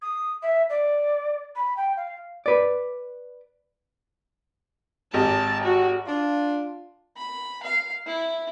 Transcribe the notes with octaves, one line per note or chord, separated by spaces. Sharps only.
D#6
E5
D5
B5
G5
F5
B4 D5
G#1 G4 D#5 A5
F#4
D4 F4
B5
F5
E4